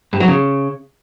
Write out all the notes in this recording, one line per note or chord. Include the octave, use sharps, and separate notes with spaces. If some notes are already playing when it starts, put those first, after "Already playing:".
G2
F#3
C#3